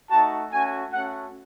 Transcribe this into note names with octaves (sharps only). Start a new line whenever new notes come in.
A3 D#4 F#4 A5
A3 C#4 F#4 G#5
A3 C#4 F#4 F#5